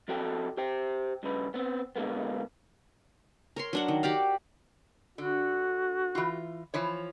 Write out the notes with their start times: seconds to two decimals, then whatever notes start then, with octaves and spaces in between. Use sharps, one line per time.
0.08 F3 C4 F#4 A4 G5
0.57 G4 C5 G5
1.23 G2 C#3 B4
1.54 B3 C4
1.96 B2 D3 G#3 A#3 B3
3.56 A#4 C#5 C6
3.73 F#3 D4 F#5
3.88 D#3
4.03 F#4 G4 D5 F5
5.18 D3 F#4
6.15 E3 F4
6.74 E3 F3 C#5